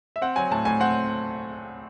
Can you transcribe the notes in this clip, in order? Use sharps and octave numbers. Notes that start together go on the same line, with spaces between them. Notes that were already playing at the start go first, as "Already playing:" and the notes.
E5
C4 F#5
F#3 G#5
A2 A5
A2 G#5
C4 F#5